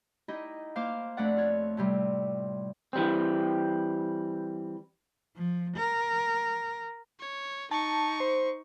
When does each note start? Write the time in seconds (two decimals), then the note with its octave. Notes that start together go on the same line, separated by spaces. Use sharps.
0.28 D#4 E4 G4 D#5
0.76 A#3 C5 F5 D6
1.17 F2 A3 D4 B4 D5 F#5
1.37 F4 C#5
1.77 A2 C3 G3
2.93 E3 G3 C4
5.36 F3
5.77 A#4
7.20 C#5
7.71 D#4 A5 C#6
8.20 C5